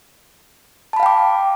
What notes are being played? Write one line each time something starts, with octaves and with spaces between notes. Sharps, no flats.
F5 G5 A5 B5 D6